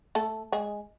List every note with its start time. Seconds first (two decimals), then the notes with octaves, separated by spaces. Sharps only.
0.15 A3 A4
0.52 G#3 G#4